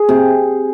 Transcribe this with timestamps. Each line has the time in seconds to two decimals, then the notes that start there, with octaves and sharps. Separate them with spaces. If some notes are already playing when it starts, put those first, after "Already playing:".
Already playing: G#4
0.09 C3